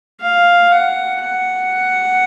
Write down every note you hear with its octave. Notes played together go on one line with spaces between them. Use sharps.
F5
F#5
F#5